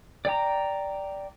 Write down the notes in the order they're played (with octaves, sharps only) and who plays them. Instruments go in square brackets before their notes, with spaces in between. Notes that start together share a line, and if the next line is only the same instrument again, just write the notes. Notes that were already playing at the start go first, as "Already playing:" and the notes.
[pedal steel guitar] D5 G5 A#5